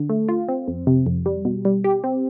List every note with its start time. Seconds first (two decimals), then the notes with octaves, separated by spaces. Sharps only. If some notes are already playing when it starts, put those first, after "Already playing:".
Already playing: D3
0.10 A3
0.29 F4
0.48 C4
0.68 F2
0.87 C3
1.07 F2
1.26 G3
1.45 B2
1.65 G3
1.84 G4
2.04 C4